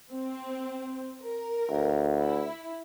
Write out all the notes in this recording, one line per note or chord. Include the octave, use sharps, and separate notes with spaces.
C4
A#4
D2
E4